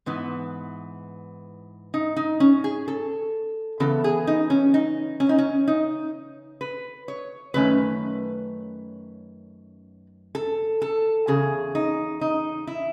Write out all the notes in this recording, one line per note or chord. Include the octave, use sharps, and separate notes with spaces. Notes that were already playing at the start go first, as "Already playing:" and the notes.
G#2 E3 B3
D#4
D#4
C#4
G#4
A4
C#3 E3 B3 A4
G#4
D#4
C#4
D#4
C#4
D#4
C#4
D#4
B4
C#5
F#2 D#3 A3 C#4 B4
A4
A4
E2 C#3 G#4
D#4
D#4
E4